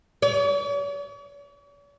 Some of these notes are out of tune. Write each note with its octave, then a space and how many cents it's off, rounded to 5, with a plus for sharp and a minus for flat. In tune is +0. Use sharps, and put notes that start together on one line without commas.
C#5 +45